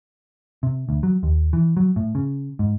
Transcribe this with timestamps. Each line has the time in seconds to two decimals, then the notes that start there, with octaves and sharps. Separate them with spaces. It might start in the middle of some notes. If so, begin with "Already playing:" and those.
0.63 C3
0.89 D2
1.03 F#3
1.23 D#2
1.53 E3
1.77 F#3
1.96 A2
2.15 C#3
2.59 G#2